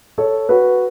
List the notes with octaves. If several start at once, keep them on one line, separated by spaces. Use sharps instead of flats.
A4 C#5
F#4 B4